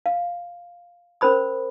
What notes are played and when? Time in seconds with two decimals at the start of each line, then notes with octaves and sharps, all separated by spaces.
0.06 F5
1.21 C#4 A#4 C5 B5 D#6